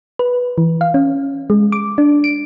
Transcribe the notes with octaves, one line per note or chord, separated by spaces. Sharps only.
B4
E3
F5
C#4
G#3
D6
D4
D7